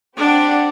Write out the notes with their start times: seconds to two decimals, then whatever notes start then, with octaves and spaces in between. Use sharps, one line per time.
0.17 C4 D4 G4 D5 F#5